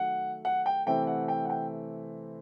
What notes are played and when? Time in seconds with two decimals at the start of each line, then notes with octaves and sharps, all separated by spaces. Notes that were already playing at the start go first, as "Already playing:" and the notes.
Already playing: D#3 F#3 A3 F#5
0.45 F#5
0.66 G5
0.86 C3 E3 A3 C4 G5
1.07 F#5
1.28 G5
1.45 F#5
1.50 G5